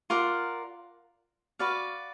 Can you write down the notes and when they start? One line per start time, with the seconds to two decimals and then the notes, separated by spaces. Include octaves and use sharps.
0.10 F4 A#4 D5 F#5
1.59 F#4 B4 D5 F5